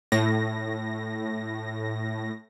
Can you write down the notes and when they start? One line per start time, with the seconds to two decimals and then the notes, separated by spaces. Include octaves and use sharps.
0.12 A2 A#6